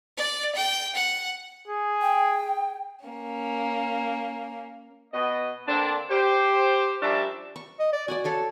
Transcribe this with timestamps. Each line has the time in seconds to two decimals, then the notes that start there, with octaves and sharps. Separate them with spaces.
0.17 D5
0.55 G5
0.95 F#5
1.67 G#4
2.02 G5
3.05 A#3 C#4
5.13 B2 B3 F#4 D#5
5.67 D3 A#3 C4 D4
6.10 G4 C5
7.01 F3 G3 C#4 D4 A#4 E5
7.56 C#6
7.80 D#5
7.93 D5
8.08 F#4 D5 F#5 G#5
8.24 A4 C#5 F5